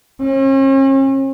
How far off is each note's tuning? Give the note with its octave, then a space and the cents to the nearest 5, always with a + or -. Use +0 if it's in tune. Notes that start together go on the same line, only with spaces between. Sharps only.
C#4 -45